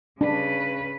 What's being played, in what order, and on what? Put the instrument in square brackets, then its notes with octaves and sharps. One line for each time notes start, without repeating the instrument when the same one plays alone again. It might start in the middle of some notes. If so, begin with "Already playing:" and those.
[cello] C#3 B4 [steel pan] D4